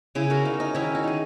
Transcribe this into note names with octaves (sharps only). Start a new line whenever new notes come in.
C#3 E4 G#4
F#4 A#4
C#3 D#4
D#4
D#3 C#4 E4
D#4 F#4
D#3 G#4